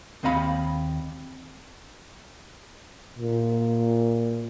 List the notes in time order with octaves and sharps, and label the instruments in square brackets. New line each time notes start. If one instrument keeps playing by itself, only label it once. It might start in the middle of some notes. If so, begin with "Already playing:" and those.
[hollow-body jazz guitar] D#2 C4 D#5 F5 B5
[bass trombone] A#2